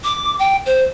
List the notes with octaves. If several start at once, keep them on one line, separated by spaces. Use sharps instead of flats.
D6
G5
C5